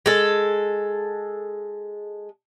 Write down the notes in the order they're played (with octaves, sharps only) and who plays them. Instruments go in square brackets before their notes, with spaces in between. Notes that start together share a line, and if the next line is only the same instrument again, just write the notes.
[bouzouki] G#3 A4